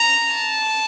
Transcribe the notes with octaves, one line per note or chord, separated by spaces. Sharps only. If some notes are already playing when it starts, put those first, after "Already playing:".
Already playing: A#5
A5